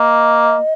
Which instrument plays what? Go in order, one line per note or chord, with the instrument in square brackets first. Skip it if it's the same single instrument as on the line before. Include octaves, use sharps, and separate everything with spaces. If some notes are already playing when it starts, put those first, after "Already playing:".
Already playing: [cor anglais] A#3 [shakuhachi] D#5